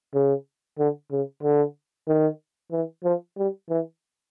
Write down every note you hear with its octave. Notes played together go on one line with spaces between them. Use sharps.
C#3
D3
C#3
D3
D#3
E3
F3
G3
E3